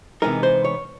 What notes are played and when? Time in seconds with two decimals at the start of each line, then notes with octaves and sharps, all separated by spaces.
0.22 C3 E3 G#3 B3 D#4 A#4
0.43 C5
0.65 C#5